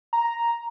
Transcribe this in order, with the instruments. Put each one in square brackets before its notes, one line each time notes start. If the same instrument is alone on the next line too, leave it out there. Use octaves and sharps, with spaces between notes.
[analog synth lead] A#5